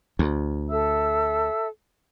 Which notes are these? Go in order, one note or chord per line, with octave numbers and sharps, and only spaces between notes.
D2
A4 E5 E6